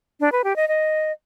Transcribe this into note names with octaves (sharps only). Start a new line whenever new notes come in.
D4
B4
G4
D#5
D#5